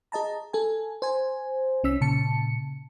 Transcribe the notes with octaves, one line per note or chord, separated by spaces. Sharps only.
G#4 D#5 A5 A#5
A4 G#5
C5 G#5
C2 C#4 E6 B6
A#2 C#3 A5 C#7